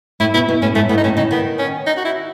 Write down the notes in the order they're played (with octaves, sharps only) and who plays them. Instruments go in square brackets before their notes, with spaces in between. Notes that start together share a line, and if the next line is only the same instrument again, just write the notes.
[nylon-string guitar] A2 [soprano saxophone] E4
[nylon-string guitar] B2 [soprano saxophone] E4
[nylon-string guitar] B2
[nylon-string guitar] A2 [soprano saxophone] C#4
[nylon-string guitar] G#2 [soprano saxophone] A3
[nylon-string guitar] A2 [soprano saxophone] B3
[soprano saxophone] D#4
[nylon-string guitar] A2 [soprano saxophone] C#4
[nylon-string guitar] C#3 [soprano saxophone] D#4
[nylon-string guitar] D#3 [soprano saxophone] B3
[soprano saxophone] C#4
D#4
F#4
E4